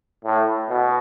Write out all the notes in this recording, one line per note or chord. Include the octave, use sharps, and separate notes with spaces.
A2
B2